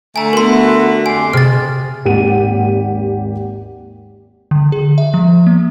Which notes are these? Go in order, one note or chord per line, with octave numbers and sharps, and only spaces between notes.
D3 A3 G#5 A#5
B3 F#4 A#4 C6
F2 G4 G#5 C6
C3 G#4 F6 A6
G#1 D#2 G4 F#5 D#7
D3
G#4
E5
F3
A#3